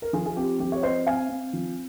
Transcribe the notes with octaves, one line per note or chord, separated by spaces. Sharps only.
A#4
F3 F4 G#4
G#4
C4 G4
F3 G4
C#5
C4 C5 D#5
C4 F5 G#5
C4
F3